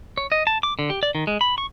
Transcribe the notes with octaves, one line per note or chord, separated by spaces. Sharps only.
C#5
D#5
A5
D6
D3
G4
D5
D#3
G#3
B5
C#6